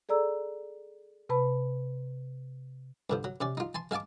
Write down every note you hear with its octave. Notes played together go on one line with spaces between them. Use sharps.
G#4 A4 D5 A#5 E6
C3 B4 A5 B5
G2 D3 F3
F#3
C3 C#4 D5
D#4 F4
G#5 A5 C6
G#3 F5 G#5 A5 D6